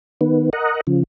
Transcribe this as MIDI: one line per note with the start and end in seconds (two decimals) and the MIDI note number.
0.21 0.50 51
0.21 0.50 59
0.53 0.81 70
0.53 0.81 75
0.53 0.81 78
0.87 1.03 49
0.87 1.03 53